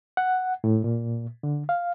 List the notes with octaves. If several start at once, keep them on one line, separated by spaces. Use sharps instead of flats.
F#5
A2
A#2
D3
F5